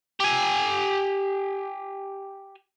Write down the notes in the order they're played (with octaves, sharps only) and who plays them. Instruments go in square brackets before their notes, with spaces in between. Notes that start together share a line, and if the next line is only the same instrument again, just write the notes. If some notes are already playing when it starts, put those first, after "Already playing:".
[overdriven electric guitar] G4 G#5